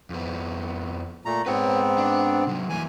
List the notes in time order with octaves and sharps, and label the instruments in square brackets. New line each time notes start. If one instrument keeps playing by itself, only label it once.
[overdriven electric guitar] F2 B3
[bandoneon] A#2 A3 A#5
[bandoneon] G#2 B3 C4 [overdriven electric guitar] B4 C#5
[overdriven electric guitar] D4
C3 F#3
[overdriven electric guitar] E3 A#3 [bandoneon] G#5